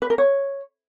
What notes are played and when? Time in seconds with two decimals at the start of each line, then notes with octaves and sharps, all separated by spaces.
0.02 B4
0.10 A#4
0.18 C#5